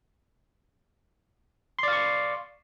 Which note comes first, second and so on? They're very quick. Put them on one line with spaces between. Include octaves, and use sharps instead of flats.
C6 D5 F5 C#6